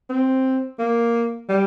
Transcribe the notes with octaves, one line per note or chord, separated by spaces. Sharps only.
C4
A#3
G3